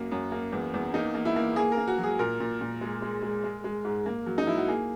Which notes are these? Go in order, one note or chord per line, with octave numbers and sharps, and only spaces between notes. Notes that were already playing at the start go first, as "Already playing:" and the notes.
Already playing: F#2 A#3 F#4
F#2
A#3
E2
E2
A#3 D#4
A#3
E4
A#3
A#3 G#4
A#4
A#3
F#4
F#3
G#4
A#2 A#4
A#2
A#2
G#3
G#3
G#3
G#3
G#3
G#2
A#3
F#3
D#4
F#3 E4
F#4
A#3 G#4